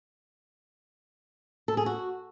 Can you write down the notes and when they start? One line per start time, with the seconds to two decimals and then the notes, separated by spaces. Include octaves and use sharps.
1.68 A4
1.77 G#4
1.86 F#4